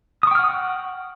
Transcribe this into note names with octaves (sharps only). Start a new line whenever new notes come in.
F#5 G5 C#6 D#6 F6